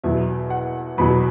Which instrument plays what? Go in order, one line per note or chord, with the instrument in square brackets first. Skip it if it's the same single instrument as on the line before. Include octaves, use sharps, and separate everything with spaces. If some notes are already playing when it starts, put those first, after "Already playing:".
[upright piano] E2 B2 F#3 E5
F#5
E2 B2 F#3 B5